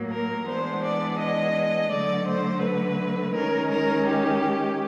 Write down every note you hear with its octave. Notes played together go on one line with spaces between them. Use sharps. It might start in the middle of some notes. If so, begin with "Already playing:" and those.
Already playing: A2 F#3 A#3
A#4
E3 G#3 B3 D4 C5
D5
D#5
D3 F#3 A3 D5
C5
B4
D#3 G#3 C#4 A#4
A#4
G4